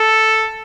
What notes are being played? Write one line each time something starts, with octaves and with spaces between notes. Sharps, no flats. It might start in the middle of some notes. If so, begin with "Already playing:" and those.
Already playing: A4